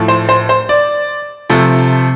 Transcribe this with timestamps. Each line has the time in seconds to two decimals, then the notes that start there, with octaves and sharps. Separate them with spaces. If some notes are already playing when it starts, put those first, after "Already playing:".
Already playing: A2 F3 A3
0.08 C5
0.29 C5
0.49 C5
0.69 D5
1.50 C3 F3 A3